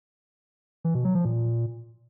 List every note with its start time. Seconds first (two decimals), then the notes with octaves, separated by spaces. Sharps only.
0.85 E3
0.95 B2
1.05 F#3
1.15 F3
1.25 A#2